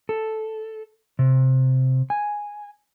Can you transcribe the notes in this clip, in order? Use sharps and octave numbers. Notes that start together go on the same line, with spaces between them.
A4
C3
G#5